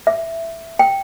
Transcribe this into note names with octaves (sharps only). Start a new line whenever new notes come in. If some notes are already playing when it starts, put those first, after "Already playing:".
E5
G5